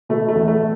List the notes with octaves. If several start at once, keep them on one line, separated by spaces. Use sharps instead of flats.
B2 A3
A3
E2
A3